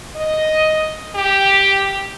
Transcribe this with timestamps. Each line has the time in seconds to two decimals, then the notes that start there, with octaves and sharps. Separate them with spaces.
0.16 D#5
1.15 G4